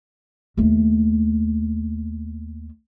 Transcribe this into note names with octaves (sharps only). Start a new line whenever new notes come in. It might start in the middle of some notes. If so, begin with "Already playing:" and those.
D#2 A3